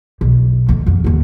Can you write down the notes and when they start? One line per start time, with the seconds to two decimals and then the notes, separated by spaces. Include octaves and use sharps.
0.21 B1
0.69 D2 D#3
0.86 G1 F2
1.04 D#2 B3